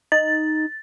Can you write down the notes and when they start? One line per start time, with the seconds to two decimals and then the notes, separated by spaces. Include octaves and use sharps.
0.12 D#4 A6